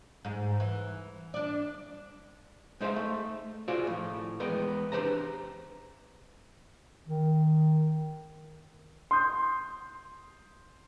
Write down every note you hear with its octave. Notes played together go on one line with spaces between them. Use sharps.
G#2
E3
D4 D5
G#3 D#4 C5 E5 F5
A3
F4 F#4 G#4 C5 D5
A2 F3
E2 G#3 B3 A#4 D5 G5
D4 G4 B4 C5 A5 A#5
D#3
C6 D#6 G6